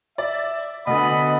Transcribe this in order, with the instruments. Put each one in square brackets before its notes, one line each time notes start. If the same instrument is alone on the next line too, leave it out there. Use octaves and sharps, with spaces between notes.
[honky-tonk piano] D5 [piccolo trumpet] E5
[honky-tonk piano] D2 D3 [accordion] B3 [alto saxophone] D#5 [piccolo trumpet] B5